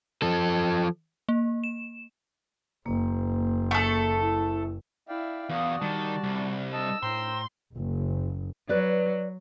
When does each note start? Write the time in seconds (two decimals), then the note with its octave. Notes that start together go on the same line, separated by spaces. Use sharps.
0.22 F3 A4
1.29 A#3
1.64 E7
2.86 F#1 A#3
3.71 A3 A4
4.21 E4
5.08 E4 D5 E5 F5 G5
5.50 E2 F#4 D5 F5 D#6
5.82 D#3 G3 A5
6.23 C2
6.73 D#5 A5 E6
7.03 A2 C5 G5 A#5 C6
7.75 F#1
8.69 F#3 B4 D5